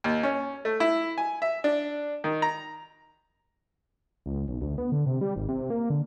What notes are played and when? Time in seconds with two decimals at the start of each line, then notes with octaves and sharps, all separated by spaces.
0.04 D#2
0.23 C#4
0.65 A3
0.80 E4
1.18 G#5
1.42 E5
1.64 D4
2.24 D#3
2.42 A#5
4.26 C#2
4.48 B1
4.61 D2
4.78 B3
4.92 D3
5.06 C3
5.21 G3
5.36 G#1
5.49 C3
5.70 A#3
5.90 D3